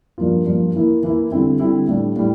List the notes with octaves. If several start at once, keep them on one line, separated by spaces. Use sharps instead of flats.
G2 F3 A#3 F4
G2 F3 A#3 F4
E3 A#3 E4
E3 A#3 E4
D3 G3 C4 E4
D3 G3 C4 E4
A2 G3 D4
A2 G3